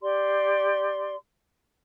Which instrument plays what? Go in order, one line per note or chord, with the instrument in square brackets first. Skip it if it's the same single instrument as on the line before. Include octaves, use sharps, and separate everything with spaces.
[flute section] G4 D5 C6